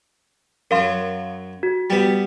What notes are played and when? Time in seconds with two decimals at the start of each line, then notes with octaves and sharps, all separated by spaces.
0.71 F#2 F#3 A#4 F5 C6
1.63 F#4
1.90 G3 B3